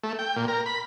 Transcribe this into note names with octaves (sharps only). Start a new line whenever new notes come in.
A3
G5
A#2
A#4
B5